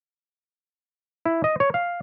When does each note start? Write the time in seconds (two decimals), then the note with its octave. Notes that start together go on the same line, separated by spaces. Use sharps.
1.25 E4
1.44 D#5
1.60 C#5
1.74 F5